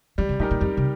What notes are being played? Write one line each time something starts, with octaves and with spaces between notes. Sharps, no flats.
F3 G3
C3
A#2 D#4 G4 A#4
A#2
F2 G3
C3